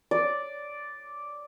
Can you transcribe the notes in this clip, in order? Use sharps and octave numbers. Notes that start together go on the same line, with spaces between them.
D5